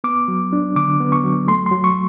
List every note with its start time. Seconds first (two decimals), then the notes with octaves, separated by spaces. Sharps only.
0.04 B3 D6
0.28 F#3
0.53 D4
0.76 D3 D6
1.00 B3
1.12 C#6
1.24 F#3
1.48 A3 C6
1.66 C6
1.71 F#3
1.84 C#6